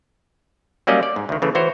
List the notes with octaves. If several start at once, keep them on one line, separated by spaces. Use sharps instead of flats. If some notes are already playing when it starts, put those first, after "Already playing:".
F#3 G3 A#3 C#4 D5 D#5
D5
G#2
D2 D#3
C#3 E3 A3
E3 F#4 C5 C#5